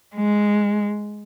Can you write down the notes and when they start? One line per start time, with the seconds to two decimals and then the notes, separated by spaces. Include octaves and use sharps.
0.15 G#3